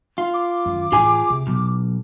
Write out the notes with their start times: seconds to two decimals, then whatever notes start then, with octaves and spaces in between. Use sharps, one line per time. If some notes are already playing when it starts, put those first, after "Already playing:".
0.18 F4
0.33 D6
0.65 F#2 D#3
0.92 A2 E3 F4 G#4 G#5
1.30 C3
1.47 E1 B1